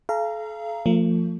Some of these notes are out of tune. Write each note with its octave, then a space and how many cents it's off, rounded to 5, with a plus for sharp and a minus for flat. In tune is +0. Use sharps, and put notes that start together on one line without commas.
A4 -40 F5 -30 A#5 +0
F3 +0 A3 +40